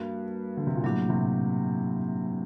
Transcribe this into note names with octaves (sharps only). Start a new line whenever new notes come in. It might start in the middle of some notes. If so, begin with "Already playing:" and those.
Already playing: G2 A#3 F#4 A#4
D3
C3
A#2
A2 F#3 A#3 D4 G4
A2 C3